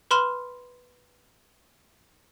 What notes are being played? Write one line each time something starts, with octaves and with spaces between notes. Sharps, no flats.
B4 B5 C6 F6 E7